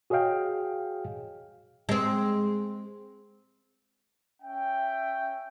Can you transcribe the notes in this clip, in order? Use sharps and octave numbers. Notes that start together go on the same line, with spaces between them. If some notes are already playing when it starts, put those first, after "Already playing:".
F#4 G#4 C#5 D#5 F5 G5
G#3 C4
C#4 E5 G5